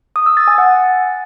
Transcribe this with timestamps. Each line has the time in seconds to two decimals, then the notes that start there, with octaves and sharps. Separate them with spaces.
0.16 D#6
0.26 E6
0.37 A6
0.48 G#5
0.58 F#5